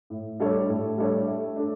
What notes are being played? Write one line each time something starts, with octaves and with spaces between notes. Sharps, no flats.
A2
G3 D4 A4 C#5
A2
G3 D4 A4 C#5
A3
D4 A4